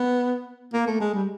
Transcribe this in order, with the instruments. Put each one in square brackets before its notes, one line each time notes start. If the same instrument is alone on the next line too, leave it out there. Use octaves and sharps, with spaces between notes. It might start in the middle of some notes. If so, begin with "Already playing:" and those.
Already playing: [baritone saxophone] B3
A#3
A3
G#3
G3